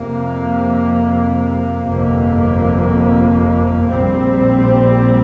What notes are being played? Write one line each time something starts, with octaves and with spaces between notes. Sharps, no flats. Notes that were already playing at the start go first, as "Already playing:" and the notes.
Already playing: F2 C3 A#3
G1 F2 C3 A#3
A#1 A#2 G3 C4